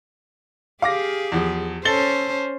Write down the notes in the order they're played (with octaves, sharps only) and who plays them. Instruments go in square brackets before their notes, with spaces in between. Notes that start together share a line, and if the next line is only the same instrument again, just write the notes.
[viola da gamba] G4 G#4 [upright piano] F5 D6 A#6
[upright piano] E2 F3
[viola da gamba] C#4 C5 [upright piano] A4 A6 G7